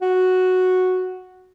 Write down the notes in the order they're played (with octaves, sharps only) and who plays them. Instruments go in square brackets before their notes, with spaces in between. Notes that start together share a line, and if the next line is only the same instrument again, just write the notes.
[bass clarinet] F#4